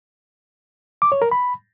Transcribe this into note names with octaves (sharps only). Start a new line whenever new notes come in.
D6
C#5
A#4
B5